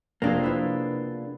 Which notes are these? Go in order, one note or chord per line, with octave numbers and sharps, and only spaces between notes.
F1 A#3 C4 D4 F4 G#4
B3 E4